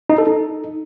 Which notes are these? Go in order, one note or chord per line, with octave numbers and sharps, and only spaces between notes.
D#4
A4
D#4